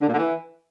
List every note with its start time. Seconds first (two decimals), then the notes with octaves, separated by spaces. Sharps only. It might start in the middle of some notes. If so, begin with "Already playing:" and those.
0.01 D3
0.07 A#2
0.12 D3
0.18 E3